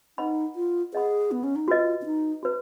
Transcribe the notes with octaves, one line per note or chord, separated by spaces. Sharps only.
D#4 B4 D#5 F#5 B5
F4
G#4 B4 D#5 F#5 B5
B3
C#4
D#4
F4 F#4 B4 D#5
C#4
D#4
F#4 B4